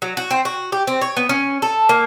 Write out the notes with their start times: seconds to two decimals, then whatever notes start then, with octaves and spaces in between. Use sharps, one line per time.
0.02 F#3
0.17 F#4
0.31 C4
0.45 F#4
0.72 G4
0.87 C4
1.01 C#5
1.17 B3
1.29 C#4
1.62 A4
1.89 A#3